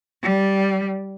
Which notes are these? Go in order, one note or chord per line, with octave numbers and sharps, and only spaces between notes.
G3